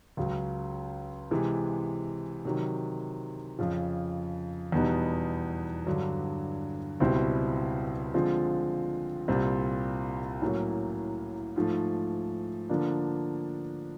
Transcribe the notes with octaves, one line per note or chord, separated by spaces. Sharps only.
C#2 C#3 F#3
C3 E3 G#3
C3 D#3 F#3
F2 C#3 F3
E2 B2 G3 B3 D#4
G2 D3 F#3
C#2 B2 G3 C4 E4
D3 F3 G#3 C4 F4
C2 A#2 G3 C4 F4
A2 F#3 A#3 C#4
G#2 F3 A3
D3 F3 A#3 D4